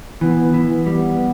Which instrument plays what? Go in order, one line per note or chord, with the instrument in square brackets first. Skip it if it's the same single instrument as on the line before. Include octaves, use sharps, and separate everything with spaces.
[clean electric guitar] E3 [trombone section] B3
[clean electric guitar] E3
[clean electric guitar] G3 [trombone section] B3